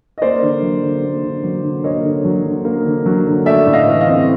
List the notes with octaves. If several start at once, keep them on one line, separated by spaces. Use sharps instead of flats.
D#5
A#3 C5 D5
D3
F#3
D3
A#3
D3
F#3
D3
A#3 C#5 D#5
D3
F#3
D3
A#3
D3
F#3
D3
A3 D5 E5
A2
D#5 F5
E3
D#5 F5
C4